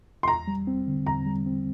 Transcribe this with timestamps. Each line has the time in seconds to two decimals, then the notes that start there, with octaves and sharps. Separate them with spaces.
0.23 C6
0.28 E2 A#5
0.48 G3
0.67 C4
0.87 D3
1.07 E2 A#5
1.26 G3
1.46 C4